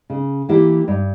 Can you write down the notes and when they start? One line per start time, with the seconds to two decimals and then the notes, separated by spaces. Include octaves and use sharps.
0.10 C#3
0.49 E3 A#3 E4 G4
0.88 G2